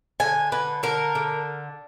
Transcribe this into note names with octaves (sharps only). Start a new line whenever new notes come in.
D3 G#5
D3 B4
D3 A#4
D3